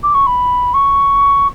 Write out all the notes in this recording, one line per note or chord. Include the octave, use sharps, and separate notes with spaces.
D6
C#6
B5
C#6